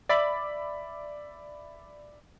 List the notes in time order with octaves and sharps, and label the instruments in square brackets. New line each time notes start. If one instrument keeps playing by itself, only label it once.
[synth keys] D5 E5 B5